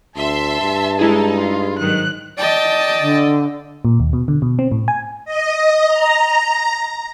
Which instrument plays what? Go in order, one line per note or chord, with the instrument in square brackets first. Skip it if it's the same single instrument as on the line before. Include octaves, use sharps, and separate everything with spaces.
[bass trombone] D2 [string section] E5 C6 [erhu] A5
[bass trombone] G2
[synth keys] G#3 E4 G#4 [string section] D#4
[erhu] F4
[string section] G#2 D#3 F#3 [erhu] F#6
[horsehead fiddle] D5 D#5 [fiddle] G5 A5
[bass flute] D3
[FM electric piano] A#2
D#2
B2
D3
B2
C4
A2
G#5
[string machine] D#5
A#5